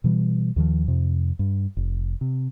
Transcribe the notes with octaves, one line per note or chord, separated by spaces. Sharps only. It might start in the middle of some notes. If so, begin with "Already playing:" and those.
B2 E3 G3
D#2 D#3 F3
F2 C3
G2
F1
C3